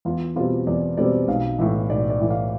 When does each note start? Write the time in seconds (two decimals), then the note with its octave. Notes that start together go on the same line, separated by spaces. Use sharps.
0.05 E2 F4
0.36 B2 G3 C4 F4
0.67 E2 D5
0.97 B2 G3 C4 D5
1.28 B1 F5
1.58 A2 E3 E5
1.89 B1 D5
2.10 D5
2.20 A2 E3
2.30 F5